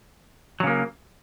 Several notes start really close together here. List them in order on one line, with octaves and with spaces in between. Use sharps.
F#3 C#3 A#3